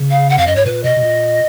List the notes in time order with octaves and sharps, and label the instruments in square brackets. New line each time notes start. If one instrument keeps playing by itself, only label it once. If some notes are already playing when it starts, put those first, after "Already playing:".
Already playing: [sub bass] C#3
[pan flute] F5
F#5
[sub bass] F2 [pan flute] F5
[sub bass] F#2 [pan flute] D#5
[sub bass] G#2 [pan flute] C#5
[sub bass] A#2 [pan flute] B4
[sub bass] B2 [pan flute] D#5
[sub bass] B2
A#2